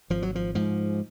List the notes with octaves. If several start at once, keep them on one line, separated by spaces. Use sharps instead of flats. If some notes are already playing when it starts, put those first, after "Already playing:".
G#1 F3
F#3
F3
G#2 F3